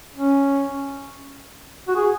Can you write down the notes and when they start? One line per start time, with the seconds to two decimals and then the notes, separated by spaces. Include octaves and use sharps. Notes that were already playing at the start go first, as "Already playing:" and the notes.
0.16 C#4
1.88 F#4
1.96 G#4